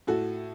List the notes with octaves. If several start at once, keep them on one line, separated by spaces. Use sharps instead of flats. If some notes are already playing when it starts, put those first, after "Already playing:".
A2 F#4 A4